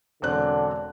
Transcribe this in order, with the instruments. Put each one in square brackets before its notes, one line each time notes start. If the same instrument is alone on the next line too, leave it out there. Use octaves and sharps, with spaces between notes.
[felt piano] E1 C4 F#6 [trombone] D3